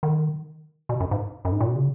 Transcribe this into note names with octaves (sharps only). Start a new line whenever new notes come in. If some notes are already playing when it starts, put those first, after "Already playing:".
D#3
B2
F#2
G#2
F#2
G#2
A#2
B2
C#3